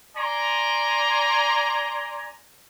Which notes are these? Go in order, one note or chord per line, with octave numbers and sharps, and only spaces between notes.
D5 G#5 A#5 C6